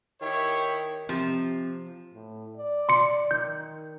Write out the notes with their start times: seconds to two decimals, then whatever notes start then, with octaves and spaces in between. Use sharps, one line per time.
0.21 D#3 E4 G4 C#5
1.09 C3 F3 C4
2.14 A2
2.57 D5
2.89 C6 C#7
3.31 D#3 G6